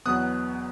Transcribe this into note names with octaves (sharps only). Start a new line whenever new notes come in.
E2 B2 F#3 B3 D#6 F#6